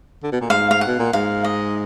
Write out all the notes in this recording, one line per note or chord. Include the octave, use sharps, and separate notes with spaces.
D3
B2
A#2
G#2 F5
F5
F#5
B2
A#2
G#2 F5
D#5